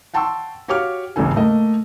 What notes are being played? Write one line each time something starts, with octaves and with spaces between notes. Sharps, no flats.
F#5 G5 A5 C6 C#6 E6
F#4 G4 C#5 F5 D6 F6
A1 D#2 G#2 C#3 A4 G#5
A3 A#3 D#5